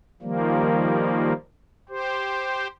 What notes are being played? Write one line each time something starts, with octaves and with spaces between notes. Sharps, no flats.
D#3 F3 G3 A#3
G4 C5